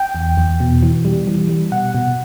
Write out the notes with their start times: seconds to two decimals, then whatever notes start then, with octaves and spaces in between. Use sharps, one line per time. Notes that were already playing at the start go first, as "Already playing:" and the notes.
Already playing: G5
0.15 E2
0.37 E2
0.60 B2
0.83 E3
1.05 G3
1.27 E3
1.49 G3
1.72 B2 F#5
1.95 B2